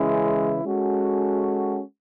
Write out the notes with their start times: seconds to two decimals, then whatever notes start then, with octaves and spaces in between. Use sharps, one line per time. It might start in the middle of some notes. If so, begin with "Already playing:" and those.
Already playing: C#3 E3 G#3 C#4 E4
0.63 G#3 C#4 F#4 A4